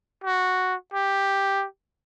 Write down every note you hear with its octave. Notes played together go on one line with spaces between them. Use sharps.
F#4
G4